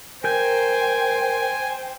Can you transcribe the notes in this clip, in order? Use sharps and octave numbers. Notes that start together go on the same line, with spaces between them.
A#4 C5 G5 G#5 G6